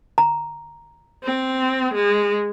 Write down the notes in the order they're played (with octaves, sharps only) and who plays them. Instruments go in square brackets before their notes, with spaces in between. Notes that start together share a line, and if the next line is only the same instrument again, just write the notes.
[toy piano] A#5
[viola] C4
G#3